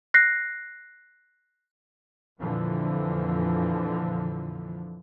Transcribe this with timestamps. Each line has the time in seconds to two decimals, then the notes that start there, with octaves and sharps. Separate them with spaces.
0.14 F#6 A#6 C7
2.40 F2 A#2 D3 E3 F3